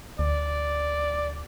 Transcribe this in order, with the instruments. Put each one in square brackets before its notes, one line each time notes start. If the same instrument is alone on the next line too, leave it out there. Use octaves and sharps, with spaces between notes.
[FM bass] D2 [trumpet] D5